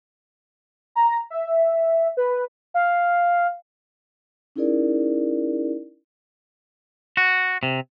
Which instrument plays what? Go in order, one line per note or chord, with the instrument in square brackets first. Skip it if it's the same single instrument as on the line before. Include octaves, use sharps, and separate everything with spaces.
[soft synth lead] A#5
E5
B4
F5
[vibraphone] C#4 D#4 E4 G#4 A#4 D5
[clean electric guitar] F#4
C3